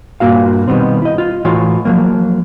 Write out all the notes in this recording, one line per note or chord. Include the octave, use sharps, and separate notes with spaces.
G2 A#2 D#3 A#3 F#4 F5
B2 D#3 G3 B3 C4
E4 D#5
F4
A2 E3 F4 F#4 C#5
F3 F#3 A#3